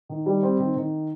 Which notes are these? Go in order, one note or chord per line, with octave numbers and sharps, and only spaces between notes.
D#3
G3
C4
D#3
D#3